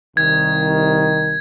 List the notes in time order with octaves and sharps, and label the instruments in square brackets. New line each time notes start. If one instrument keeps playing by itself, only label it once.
[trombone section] C2 D#3 [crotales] G#6